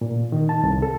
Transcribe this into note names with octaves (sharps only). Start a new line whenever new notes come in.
A#2
D#3
A5
C2
A4